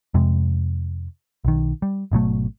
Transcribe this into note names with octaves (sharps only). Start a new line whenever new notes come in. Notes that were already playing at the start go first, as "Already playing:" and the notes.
F2 C3 G#3
B1 D#3
G3
G#1 B2 F#3 A3